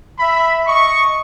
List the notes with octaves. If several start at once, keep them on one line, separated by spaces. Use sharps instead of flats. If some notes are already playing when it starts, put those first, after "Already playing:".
E5 B5
D#5 C#6